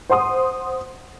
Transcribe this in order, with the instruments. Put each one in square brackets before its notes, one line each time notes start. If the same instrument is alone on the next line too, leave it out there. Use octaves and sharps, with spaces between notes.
[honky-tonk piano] C5 F#5 C6 D#6